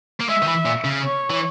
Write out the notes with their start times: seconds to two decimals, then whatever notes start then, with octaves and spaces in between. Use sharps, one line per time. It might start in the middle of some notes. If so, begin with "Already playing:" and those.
0.20 A#3
0.29 G#3 E5
0.42 D#3
0.47 E3
0.66 A#2
0.85 C#3
1.03 C#5
1.30 E3